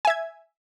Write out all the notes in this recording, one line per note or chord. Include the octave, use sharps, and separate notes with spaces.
E5 G#5 G#6